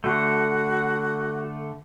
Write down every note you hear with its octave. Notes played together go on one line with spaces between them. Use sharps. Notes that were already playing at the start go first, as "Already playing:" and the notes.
D3 A3 F#4